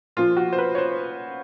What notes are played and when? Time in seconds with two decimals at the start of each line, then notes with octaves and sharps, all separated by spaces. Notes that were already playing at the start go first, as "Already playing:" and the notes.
0.17 A#2 F3 F4
0.37 F#4
0.53 C5
0.58 B4
0.75 C#5
0.78 C5